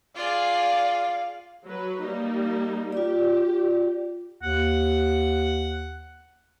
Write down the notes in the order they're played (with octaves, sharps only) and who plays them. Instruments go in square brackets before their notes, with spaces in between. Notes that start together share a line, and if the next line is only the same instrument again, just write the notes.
[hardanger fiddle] F4 G#4 [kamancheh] D5 [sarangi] F5
[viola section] F#3 B4
G3 A#3 D#4
[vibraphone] F4 D5 [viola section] G4
[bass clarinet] D#2 [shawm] F#5